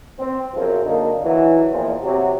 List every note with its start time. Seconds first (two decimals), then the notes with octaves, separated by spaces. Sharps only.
0.19 C4
0.54 B1 F#2 C#3 F3
0.84 D3 A#3 D4 D#4
1.23 E3 F#3
1.71 E2 A#2 D#3 F3
2.03 C3 F#3